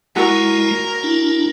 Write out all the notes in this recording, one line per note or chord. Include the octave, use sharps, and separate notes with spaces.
G#3 E4 F#4 A#4
D4 E4